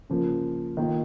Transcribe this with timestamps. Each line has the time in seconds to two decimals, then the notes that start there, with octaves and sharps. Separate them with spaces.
0.10 C#3 F3 A#3
0.77 D#3 A#3 F4